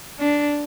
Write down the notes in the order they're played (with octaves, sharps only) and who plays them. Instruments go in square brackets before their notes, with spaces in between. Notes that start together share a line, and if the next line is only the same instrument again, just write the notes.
[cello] D4